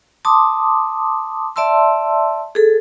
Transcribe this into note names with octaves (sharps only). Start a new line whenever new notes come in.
A5 C6 D6 D#6
D5 E5 A5 C6 E6
G#4 A4